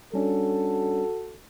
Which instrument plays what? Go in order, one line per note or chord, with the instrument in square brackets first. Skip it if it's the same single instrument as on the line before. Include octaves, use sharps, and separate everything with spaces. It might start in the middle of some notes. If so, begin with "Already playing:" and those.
[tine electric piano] G3 C#4 D4 [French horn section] F#4 A4